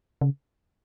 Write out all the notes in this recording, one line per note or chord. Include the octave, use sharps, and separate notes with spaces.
C#3